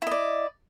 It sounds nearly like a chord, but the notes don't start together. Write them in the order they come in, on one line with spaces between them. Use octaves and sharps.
E4 D#5 D5